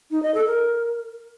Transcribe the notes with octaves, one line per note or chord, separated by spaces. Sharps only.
D#4
D#5
A4
A#4